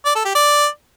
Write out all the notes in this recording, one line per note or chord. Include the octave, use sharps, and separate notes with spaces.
D5
A4
G4
D5